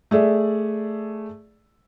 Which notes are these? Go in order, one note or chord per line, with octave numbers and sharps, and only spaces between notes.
A3 G#4 D5 E5